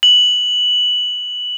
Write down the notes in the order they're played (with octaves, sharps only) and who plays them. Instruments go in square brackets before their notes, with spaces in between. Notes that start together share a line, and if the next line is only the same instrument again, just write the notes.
[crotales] F#7